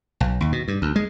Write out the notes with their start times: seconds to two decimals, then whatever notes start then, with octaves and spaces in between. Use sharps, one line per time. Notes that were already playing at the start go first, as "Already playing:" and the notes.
0.20 B1
0.41 D#2
0.52 B2
0.68 G2
0.82 D2
0.96 G#3